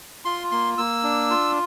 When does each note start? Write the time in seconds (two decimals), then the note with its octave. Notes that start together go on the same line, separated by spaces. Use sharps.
0.25 F4 C6
0.51 A#3 C6
0.78 A#3 E6
1.03 D4
1.30 F4